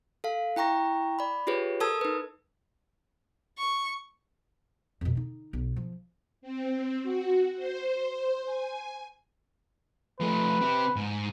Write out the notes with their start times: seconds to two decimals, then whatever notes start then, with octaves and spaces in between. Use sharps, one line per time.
0.24 A4 F5
0.56 E4 G5 A#5 C#6 A#6
1.19 D5 B5
1.47 F4 G4 G#4 B4 C#5
1.80 A4 A#4 A5 D#6 E6 G#6
2.01 D#4 B4
3.58 C#6
5.01 F2 B2
5.15 D3 D#4
5.53 B1
5.76 F3
6.42 C4
7.03 F#4
7.56 C5
8.45 G#5
10.20 F3 A3 B4
10.61 C4 G4
10.96 G#2